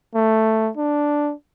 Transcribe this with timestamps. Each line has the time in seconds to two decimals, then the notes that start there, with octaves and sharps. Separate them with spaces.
0.15 A3
0.77 D4